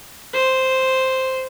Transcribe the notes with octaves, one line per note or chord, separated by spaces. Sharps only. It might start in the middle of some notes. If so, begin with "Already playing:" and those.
C5